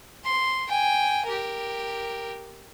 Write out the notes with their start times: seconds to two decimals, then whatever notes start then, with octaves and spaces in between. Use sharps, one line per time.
0.25 C6
0.68 G5 G#5
1.26 G4 A#4